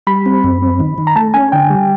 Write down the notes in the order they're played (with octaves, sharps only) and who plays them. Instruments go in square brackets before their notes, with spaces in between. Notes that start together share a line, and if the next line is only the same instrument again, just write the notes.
[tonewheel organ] G3 [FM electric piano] B5
[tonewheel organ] C4
F#2
C4
D#3
D#3
[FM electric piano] A#5
[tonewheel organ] A3 [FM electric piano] A5
[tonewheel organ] C#4 [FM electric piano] G#5
[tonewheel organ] D3 [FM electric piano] G5
[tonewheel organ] G3